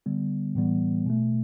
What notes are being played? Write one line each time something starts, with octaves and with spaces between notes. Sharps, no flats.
D3 G3 B3
A2 E3 G3 B3
B2 A3